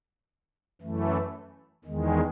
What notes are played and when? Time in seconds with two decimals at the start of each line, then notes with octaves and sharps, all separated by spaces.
0.81 F#2 E3 A3
1.84 E2 D#3 G#3